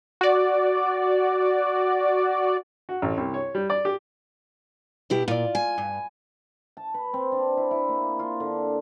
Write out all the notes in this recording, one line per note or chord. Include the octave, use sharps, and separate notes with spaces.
F#4 D5
F#4
A1
C2
C#5
G3
D5
G4
B2 E4 G4
A#2 F4 D5
G#5
G2
A5
B4
C4
D4
E4
E4
A#3
F4
D3